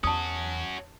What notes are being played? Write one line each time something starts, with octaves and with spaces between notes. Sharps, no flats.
E2 C#4 F#4 A5 D#6